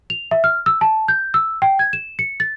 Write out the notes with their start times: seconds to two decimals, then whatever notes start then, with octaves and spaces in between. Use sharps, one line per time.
0.10 F7
0.31 E5
0.44 F6
0.66 E6
0.81 A5
1.08 G6
1.34 E6
1.62 G5
1.79 G#6
1.93 E7
2.19 C#7
2.40 A6